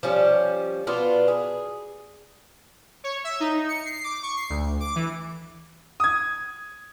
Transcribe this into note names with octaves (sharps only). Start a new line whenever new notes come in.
F3 G3 C#4
B2 B3 D4 F4
G#4
C#5
E5
D#4
C#7
C7
D6
C#6
C7
D2
D6
E3
D#6 G#6